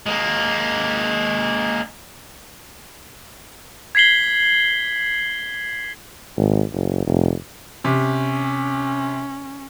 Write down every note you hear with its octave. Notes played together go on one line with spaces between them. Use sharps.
G#3 A#3
G#6 B6 C7 F#7 G7
G#1
F#1
F1
C3 C#4